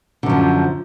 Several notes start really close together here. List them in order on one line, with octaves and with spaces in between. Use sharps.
D3 F#2 F3